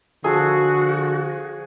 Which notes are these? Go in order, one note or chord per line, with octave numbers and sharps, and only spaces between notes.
D3 F3 F#4 G#4 A4